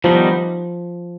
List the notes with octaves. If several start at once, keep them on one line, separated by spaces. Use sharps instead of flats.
D#3 F3 G3 B3 D#4